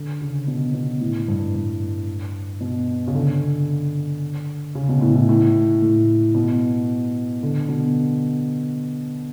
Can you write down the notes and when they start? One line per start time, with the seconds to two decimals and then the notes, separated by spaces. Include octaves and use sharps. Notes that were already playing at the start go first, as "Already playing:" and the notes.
Already playing: D3
0.21 C#3
0.47 B2
0.74 B2
1.00 A2
1.28 G2
1.55 G2
2.61 B2
3.08 C#3
3.15 D3
4.75 C#3
4.89 B2
5.01 A2
5.16 A2
5.29 A2
5.82 A2
6.35 B2
7.43 D3
7.69 B2